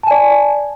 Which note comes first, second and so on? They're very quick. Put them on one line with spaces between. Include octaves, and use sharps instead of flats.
A5 G#5 D5